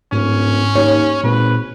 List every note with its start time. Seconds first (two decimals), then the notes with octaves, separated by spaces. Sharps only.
0.12 D1 G#2 C#4
0.75 D#2 C#5
1.24 G#1 A#2 B4